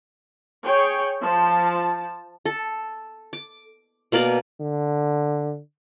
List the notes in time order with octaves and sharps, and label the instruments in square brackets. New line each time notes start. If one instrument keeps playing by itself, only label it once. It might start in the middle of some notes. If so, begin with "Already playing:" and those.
[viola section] G#4 C#5 G5
F3 A5
[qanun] A4
D6
B2 A#3 A#4 D5
[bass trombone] D3